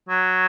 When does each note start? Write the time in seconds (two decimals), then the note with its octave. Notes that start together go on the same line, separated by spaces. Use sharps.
0.09 F#3